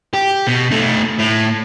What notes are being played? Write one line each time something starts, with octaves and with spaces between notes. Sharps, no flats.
G4
B2
A3 D#4
A2